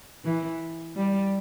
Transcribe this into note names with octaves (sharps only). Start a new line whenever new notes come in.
E3
G3